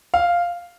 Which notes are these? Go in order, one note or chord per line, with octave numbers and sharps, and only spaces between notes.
F5